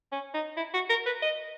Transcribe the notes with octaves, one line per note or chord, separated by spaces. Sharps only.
C#4
D#4
E4
F#4
A#4
B4
D#5